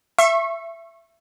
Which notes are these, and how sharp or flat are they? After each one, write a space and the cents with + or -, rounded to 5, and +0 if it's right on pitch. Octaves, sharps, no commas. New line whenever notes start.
E5 +20 C#6 -30